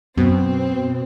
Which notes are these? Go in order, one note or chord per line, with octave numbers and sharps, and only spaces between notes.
F#2 B2 C4